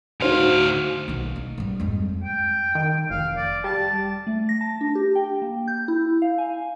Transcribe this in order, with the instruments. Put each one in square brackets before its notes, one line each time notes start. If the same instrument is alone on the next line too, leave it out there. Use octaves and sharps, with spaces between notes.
[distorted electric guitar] D2 F5 [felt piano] D#4 C5 C6 [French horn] F#4
[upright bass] B1 D#3
D#4
G#2 G3
F2 G#3
[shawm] G5
[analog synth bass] D#3
[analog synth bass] F1 [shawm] F5
[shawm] D5
[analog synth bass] G3 [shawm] A5
[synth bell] A3
A#6
A5
D4
G4
G5
A#3
G6
E4
F5
G#5